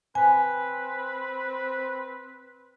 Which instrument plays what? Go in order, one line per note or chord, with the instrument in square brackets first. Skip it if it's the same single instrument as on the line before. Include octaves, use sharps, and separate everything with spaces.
[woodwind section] C4 B4 [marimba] G#5